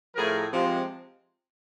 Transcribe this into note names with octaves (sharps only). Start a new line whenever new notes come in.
A2 F3 A3 G#4 A#4
C3 F3 G#3